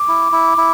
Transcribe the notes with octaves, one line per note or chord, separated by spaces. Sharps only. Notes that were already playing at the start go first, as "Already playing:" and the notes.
Already playing: D6
E4
E4
E4